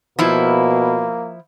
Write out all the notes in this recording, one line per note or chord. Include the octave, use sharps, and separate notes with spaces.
B2 F3 A#3 E4